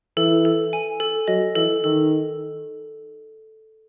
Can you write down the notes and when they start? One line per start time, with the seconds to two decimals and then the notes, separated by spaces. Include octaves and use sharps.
0.17 E3 A4
0.45 A4
0.73 G#5
1.00 A4
1.28 F#3 D#5
1.55 E3 A4
1.84 D#3 A4